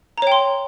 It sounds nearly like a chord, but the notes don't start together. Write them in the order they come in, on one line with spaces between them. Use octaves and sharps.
A#5 C#5 G5 C6